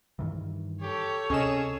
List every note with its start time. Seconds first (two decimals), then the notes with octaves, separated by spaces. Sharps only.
0.19 G2 D#3 E3
0.82 G4 A4 C#5
1.30 D2 C3 C#4 G#4 D#5 E7